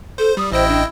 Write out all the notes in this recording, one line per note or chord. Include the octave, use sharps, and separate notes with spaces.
A4 C5
G3 D#6
A1 E4 C5 D#5 G5
D4